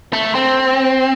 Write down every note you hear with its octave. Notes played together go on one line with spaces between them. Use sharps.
A3
C4